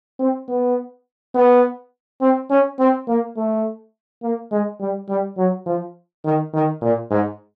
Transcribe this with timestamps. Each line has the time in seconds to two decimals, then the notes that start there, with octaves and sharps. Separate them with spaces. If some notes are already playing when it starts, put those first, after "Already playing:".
0.19 C4
0.48 B3
1.35 B3
2.21 C4
2.50 C#4
2.79 C4
3.08 A#3
3.36 A3
4.22 A#3
4.52 G#3
4.80 G3
5.09 G3
5.37 F#3
5.66 F3
6.24 D#3
6.53 D#3
6.81 A#2
7.10 G#2